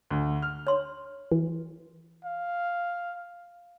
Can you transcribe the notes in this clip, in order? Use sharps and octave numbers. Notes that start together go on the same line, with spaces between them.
D2
F6
C#5 C6
E3
F5